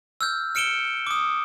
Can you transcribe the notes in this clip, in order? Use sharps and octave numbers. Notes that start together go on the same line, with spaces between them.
E6 F6 G6
F6 C#7 D7 E7 G7
D6 D#6